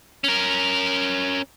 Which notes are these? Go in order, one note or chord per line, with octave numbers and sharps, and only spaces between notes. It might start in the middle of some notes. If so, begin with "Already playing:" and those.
C#4 A#4